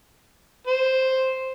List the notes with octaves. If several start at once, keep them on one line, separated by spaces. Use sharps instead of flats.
C5